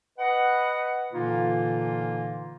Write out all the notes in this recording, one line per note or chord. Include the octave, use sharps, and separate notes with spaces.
B4 D#5 F#5
A#2 D3 E3 A#3 D#4 F4